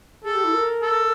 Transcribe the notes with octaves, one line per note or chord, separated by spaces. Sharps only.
G#4 A4
G4
E4
A#4
A4